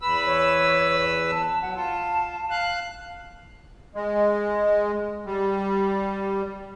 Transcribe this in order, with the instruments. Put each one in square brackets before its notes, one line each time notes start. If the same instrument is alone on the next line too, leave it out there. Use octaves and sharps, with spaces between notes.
[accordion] E2 B4 E6 [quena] B5
[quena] C#5
A5
[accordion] F#3 [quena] F#5
[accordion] F4 [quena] A5
[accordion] F5 F#6
G#3
G3